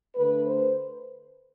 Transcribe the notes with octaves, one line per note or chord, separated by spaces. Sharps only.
D3 A3 B4
C5